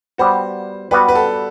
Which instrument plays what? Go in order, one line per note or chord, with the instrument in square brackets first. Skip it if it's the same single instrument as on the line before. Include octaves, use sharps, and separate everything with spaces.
[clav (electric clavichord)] G3 B3 F#4 [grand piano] C5
[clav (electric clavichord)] G3 B3 F#4 [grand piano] B4
[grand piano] B4
A4